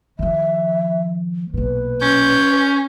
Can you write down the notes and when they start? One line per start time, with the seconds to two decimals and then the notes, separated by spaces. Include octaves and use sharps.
0.19 D#3 F3 E5
1.54 B1 A#2 B4
2.02 C#4 G6